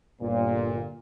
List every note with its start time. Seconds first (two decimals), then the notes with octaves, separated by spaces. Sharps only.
0.20 G1 A#2